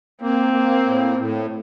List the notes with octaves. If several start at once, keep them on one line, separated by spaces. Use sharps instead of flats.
A#3 C4
A#3
A2
A2